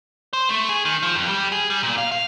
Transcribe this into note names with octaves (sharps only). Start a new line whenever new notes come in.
C5
A3
G#4
D#3
F3
F2
G3
G#4
G3
A#2
F5
F5